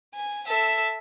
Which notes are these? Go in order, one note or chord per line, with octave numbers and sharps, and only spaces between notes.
G#5
A4 E5